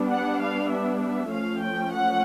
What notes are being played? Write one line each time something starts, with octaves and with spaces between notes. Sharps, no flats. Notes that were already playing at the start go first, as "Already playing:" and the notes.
Already playing: G3 B3 D4
F#5
F5
E5
E5
F3 A3 C#4 F5
G5
F#5